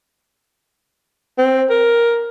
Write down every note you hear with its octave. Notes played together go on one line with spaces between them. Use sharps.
C4
A#4